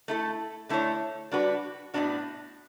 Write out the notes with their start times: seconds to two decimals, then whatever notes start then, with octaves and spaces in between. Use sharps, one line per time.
0.08 A3 E4 A4
0.69 D3 A3 E4 A4 C#5
1.32 G3 D4 F#4 B4
1.94 A2 E3 B3 D4 F#4